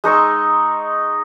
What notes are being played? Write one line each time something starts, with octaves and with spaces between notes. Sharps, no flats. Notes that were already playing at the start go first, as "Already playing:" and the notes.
G#3 D#4 C#6 E6